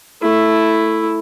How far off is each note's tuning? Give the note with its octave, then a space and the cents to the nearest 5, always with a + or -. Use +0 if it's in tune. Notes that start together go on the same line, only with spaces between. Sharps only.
A3 +0 E4 +0